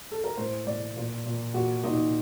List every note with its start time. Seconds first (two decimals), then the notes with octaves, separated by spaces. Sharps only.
0.12 A4
0.24 A#4
0.37 A2 C5
0.67 A2 D5
0.97 A#2
1.26 A#2
1.54 A#2 F#4
1.83 A#2 D#4